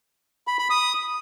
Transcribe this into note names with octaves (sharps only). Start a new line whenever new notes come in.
B5
B5
D#6